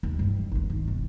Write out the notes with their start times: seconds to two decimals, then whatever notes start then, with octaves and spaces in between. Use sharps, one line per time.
0.03 D#2
0.19 G2 E3
0.52 G#1 D2
0.70 D#3
0.87 E1